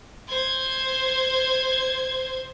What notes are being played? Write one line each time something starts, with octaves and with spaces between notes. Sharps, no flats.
C5 G#6